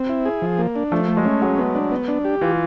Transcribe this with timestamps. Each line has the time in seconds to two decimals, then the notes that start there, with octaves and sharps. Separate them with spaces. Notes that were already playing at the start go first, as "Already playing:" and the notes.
Already playing: C4
0.09 E4
0.25 G#4
0.42 F3
0.58 A#3
0.76 D4
0.92 F3 A3
1.08 A3
1.17 G#3
1.25 C#4
1.42 F#3 G#3
1.58 B3
1.75 D4
1.91 B3
2.08 D4
2.24 G4
2.41 E3 F4